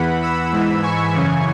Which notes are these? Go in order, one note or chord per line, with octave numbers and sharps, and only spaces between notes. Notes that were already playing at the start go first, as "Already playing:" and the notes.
Already playing: E2 E3 F#5 B5
B5 E6
G#2 E3
G#5 C#6
F#2 C#3 E3